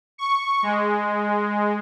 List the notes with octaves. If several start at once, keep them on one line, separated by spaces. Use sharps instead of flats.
C#6
G#3